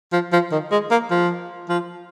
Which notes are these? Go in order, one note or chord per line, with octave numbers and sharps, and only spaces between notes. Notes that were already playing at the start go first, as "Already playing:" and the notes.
F3
F3
D#3
G#3
A#3
F3
F3